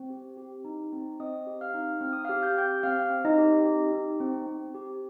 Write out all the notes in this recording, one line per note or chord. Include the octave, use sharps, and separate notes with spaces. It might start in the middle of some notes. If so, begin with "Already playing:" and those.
Already playing: C4
G4
G4
D#4
C4
C4 D#5 D#6
G4
F5 F6
D#4
C4 F6
D#6
F5 F6
G4
G6
G4 G5 G6
C4 F5 F6
C4
D#4 D#5
G4
G4
D#4
C4
C4
G4